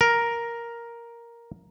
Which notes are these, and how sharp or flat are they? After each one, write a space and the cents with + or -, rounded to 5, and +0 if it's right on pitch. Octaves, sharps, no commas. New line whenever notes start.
A#4 +5